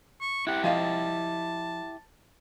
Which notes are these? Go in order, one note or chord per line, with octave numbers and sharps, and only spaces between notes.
C#6
E4 G4 F#5
F3 D#5 F5 A5